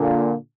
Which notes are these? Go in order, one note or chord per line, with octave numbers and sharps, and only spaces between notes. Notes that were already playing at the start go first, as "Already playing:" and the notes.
Already playing: A#2 D3